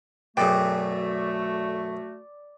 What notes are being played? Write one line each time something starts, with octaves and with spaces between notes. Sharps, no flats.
F#2 B2 A3 F#4 G#4 D5 G5